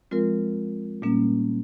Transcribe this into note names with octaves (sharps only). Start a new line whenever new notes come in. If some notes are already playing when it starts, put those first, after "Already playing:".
F3 G#3 C4 F4 A#4
A#2 G3 A#3 C#4